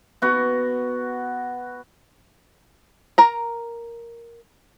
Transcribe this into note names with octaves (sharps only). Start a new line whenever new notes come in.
B3 F#4
A#4 A#5